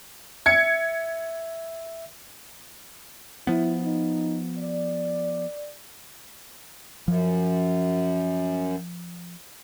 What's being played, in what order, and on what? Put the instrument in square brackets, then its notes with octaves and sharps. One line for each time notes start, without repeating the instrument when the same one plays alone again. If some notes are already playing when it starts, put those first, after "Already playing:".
[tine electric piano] E5 [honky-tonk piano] G#6 C#7
[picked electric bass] F3 B3 [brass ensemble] E4
[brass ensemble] D#4
D5
[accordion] F#2 [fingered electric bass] F3